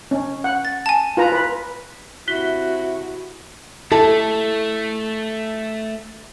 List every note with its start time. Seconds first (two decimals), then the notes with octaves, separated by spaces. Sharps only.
0.11 C#4
0.44 F#5
0.65 A6
0.86 G#5 A5
1.17 F4 B4 A#5
1.32 B4
2.28 C3 E4 F#4 F#6 B6 G7
3.92 A3 E4 G4 A4 A5